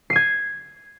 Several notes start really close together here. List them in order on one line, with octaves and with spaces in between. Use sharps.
C7 D#7 G#6